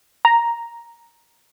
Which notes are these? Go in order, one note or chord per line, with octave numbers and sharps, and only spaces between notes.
A#5